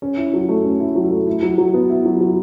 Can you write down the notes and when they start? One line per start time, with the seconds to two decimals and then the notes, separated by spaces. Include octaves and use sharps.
0.02 C#4
0.18 E4
0.34 F#3
0.49 A3
0.64 C#4
0.80 E4
0.95 F#3
1.11 A3
1.27 E4
1.43 F#3
1.58 F#3
1.74 B3
1.90 E4
2.06 F#3
2.21 F#3